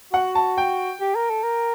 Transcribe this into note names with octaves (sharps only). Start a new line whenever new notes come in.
F#4 F#5
A5
G5
G4
A#4
A4
A#4